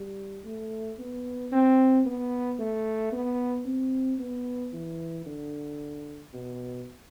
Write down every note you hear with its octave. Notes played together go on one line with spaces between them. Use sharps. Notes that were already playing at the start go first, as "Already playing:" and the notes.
Already playing: G3
A3
B3
C4
B3
A3
B3
C4
B3
E3
D3
B2